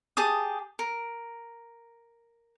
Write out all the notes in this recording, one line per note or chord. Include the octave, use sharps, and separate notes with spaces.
G4 G#4 A5 D#6
A#4